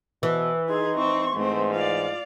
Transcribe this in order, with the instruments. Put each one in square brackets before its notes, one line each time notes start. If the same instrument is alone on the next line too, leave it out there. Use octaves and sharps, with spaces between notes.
[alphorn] B2 [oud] E3
[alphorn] D#4 [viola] G#4 [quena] C6
[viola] C4 C#6
[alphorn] G#2 [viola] A3 C4
[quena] F4 [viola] D5 F5